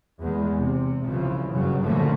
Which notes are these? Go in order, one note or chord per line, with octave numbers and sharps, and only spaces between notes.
E2 G#3
C3
C2 C#3 E3 F3
F#1 G2 C#3 F#3
A#2 D3 F3 A3 A#3 C#4